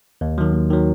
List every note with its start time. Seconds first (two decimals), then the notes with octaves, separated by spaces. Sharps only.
0.21 D#2
0.38 D#3 F#3
0.54 D#2
0.71 D#3 F#3